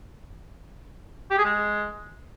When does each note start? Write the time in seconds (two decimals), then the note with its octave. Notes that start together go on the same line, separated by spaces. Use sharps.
1.31 G4
1.38 G#4
1.45 G#3